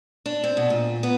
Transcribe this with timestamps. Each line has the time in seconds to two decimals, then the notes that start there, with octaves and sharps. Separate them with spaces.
0.26 D4
0.43 C4
0.57 B2
0.70 A#2
1.03 B3